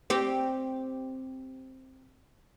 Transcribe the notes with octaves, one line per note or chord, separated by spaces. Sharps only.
C4 G4